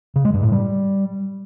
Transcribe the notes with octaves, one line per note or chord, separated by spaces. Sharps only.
C#3
G#3
G2
A2
G3